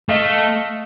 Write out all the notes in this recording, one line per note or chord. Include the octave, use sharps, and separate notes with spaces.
A3 D#5 F5